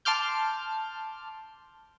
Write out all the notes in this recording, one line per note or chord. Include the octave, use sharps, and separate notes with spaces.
A5 C6 D6 F6 G6